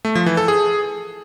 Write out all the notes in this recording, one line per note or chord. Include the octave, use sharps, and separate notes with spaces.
A3
F3
E3
A4
G#4